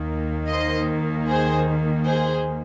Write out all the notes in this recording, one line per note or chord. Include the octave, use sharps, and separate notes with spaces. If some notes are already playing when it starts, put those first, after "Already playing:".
Already playing: D#2 D#3 A#3
C5 D#5
G#4 C5
G#4 C5